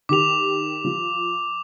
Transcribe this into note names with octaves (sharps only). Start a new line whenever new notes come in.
D#3 G4 D6 F7
F3